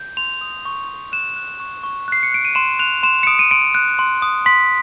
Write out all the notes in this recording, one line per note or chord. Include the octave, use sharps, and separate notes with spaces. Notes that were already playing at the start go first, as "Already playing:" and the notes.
Already playing: G6
C6 F7
D#6
C#6
C#6
F#6 E7
F#6
C#6
C#6
F#6 C7
C#7
F#6 D7
D#7
C6 E7
F#6 F7
C6 E7
C#7
D#6 D7
D#7
C6 D7
F#6
C6
D#6
C6 B6